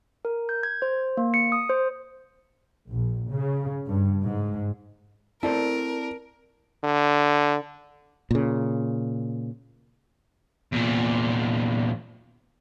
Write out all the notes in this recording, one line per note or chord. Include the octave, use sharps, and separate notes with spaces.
A#4
G6
G#6
C5
A#3
C#7
D#6
C5
A#1
C#3
G2
G#2
C4 E4 A4 A#4 C5 D5 A5
D3
A#2 C#3
E2 A#2